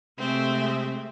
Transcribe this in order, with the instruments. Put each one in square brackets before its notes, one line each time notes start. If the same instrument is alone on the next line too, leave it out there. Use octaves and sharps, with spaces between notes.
[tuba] C3 [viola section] G#3 A3 E5 [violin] C4